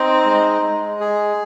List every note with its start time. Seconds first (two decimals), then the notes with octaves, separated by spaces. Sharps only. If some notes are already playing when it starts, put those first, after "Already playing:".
Already playing: C4 D#4 D#5
0.25 G#3
0.62 G#3
1.00 G#4